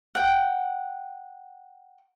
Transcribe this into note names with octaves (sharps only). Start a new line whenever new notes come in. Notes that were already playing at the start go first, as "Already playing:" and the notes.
F#5 G5